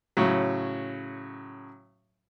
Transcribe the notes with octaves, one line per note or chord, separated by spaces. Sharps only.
A2 C#3 F#3